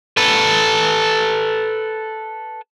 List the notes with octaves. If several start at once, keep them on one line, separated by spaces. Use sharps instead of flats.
A4 B4